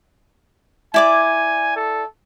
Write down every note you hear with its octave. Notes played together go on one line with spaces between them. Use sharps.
E4 D5 G#5 D6
A4